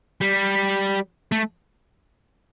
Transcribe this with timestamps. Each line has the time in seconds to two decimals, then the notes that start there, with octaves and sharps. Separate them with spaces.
0.21 G3
1.32 A3